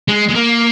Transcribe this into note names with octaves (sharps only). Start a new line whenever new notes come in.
G#3
G#3
A#3